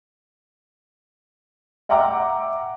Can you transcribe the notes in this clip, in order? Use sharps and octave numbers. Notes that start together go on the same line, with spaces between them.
E5 F#5 G5 A#5 D6 E6